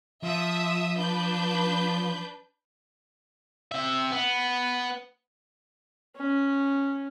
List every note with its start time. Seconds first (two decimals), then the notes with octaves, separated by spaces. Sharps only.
0.24 F3 E5 D#6
0.98 D4 B4 G6
3.72 C3 E5
4.11 B3
6.17 C#4